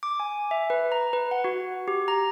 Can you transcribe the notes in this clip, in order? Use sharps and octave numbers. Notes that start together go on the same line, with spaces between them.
D6
G#5
E5
B4
A#5
B4
F#5
F#4
G4
A#5